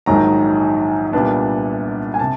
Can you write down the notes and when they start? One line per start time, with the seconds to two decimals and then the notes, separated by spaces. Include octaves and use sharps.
0.06 A#1 G#2 D#3 F#3 A#5
1.13 C2 A#2 G3 B3 D4 A5
2.14 G#5
2.19 C3 A5